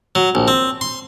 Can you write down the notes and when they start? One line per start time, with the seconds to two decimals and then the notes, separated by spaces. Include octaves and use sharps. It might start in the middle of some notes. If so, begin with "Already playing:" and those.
0.15 F#3
0.35 A#1
0.48 C4
0.81 C6